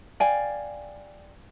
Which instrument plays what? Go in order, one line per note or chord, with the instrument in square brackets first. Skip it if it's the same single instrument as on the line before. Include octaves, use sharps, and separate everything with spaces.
[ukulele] D5 F5 G5 G#5